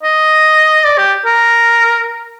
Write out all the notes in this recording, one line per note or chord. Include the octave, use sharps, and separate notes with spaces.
D#5
D5
G4
A#4